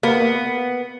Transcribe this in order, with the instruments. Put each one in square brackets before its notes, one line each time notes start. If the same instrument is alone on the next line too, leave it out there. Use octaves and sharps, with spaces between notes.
[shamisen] A#3 [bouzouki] B3